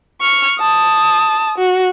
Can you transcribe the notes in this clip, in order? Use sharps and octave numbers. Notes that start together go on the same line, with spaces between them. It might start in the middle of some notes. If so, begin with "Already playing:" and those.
C#6 F6
A5 D#6
F#4